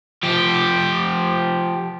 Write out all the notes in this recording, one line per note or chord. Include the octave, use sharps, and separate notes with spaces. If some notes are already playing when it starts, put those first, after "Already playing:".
F3 G4